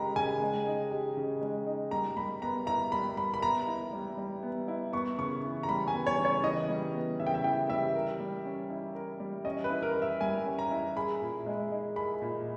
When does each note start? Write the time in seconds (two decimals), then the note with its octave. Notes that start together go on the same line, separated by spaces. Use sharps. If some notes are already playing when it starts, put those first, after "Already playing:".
Already playing: C#3 G#3 D#4 G4 A#5 B5
0.16 C#3 G#5
0.41 G#3
0.67 D#4
0.91 G4
1.17 C#3
1.41 G#3
1.66 D#4
1.91 G3 A#5
2.17 G3 B5
2.42 B3 A#5
2.66 E4 A#5
2.92 G3 B5
3.17 G3 B5
3.34 B5
3.42 B3 A#5
3.67 E4
3.93 G3
4.17 G3
4.43 B3
4.68 E4
4.93 B3 C#6
5.18 C#3 C#6
5.43 E3
5.63 A#5
5.69 G3 B5
5.88 G#5
5.93 B3
6.07 C#5
6.19 C#3
6.25 C#5
6.43 E3 D#5
6.69 G3
6.94 B3
7.19 C#3 E5
7.27 G5
7.34 E5
7.44 E3 G5
7.69 G3 E5
7.95 A#4
8.20 G3
8.45 C#4
8.70 E4
8.95 A#4
9.20 G3
9.45 C#4 D#5
9.64 B4
9.70 E4
9.83 A#4
9.96 A#4
10.02 E5
10.21 G3 G#5
10.46 C#4
10.59 A#5
10.71 E4
10.97 G#4 B5
11.21 A#2
11.46 G#3
11.71 D#4
11.96 G#4 B5
12.22 A#2